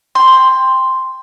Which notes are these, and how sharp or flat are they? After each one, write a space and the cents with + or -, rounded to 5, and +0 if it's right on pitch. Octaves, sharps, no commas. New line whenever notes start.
G5 +20 C6 +0